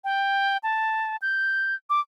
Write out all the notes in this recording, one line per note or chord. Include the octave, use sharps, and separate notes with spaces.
G5
A5
G6
D6